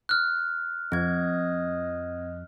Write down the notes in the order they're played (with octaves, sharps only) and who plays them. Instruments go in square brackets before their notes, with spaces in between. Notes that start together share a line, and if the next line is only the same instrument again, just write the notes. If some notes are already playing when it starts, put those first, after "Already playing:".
[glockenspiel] F6 F#6
[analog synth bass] F2 [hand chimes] C4 G#6 [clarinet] D#5